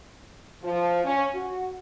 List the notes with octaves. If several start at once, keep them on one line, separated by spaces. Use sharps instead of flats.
F3
C#4
F#4